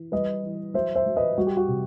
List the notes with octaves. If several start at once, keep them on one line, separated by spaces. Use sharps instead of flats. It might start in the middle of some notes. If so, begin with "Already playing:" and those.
Already playing: E3
G3 B4 D#5
E3
F#3 C5 E5
C5 E5
F#3
B4 D#5
G3 F#4
G4
F#4
C3